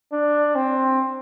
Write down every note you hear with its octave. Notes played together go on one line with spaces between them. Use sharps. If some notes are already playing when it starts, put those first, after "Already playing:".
D4
C4